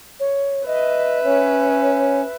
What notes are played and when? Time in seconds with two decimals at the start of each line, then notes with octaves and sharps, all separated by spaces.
0.20 C#5
0.67 B4 D#5 E5
1.24 C#4 C#5